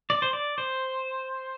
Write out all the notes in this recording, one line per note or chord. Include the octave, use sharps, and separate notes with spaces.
D5
C5
D5
C5